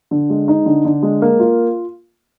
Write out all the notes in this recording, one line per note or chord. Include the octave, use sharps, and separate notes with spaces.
D3
G#3
D#4
D3
D3
G#3
A#3
F4